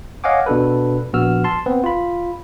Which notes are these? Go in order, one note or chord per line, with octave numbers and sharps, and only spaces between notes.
C#5 D#5 F5 F#5 G#5 D6
B2 D4 A4 B4
A#1 B3 F#4 E6 F6
A5 C6
B3 C4 B4
F4 B5